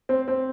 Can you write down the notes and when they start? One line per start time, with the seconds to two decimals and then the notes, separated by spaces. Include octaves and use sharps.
0.09 C4
0.28 C4